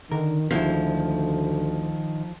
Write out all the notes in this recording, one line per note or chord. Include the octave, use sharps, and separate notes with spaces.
D3 D#3 A#4
D2 D3 D#3 F3 G#3 E4